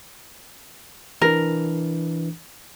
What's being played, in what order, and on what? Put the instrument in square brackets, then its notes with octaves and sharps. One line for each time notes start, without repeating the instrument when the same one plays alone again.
[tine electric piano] E3 D4 [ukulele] A#4